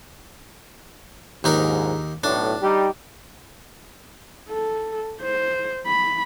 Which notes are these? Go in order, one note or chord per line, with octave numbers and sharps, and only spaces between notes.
A#1 D#2 G#2 D#4 A#4
B1 A2 D4
G3 D#4 G4
A4
C5
B5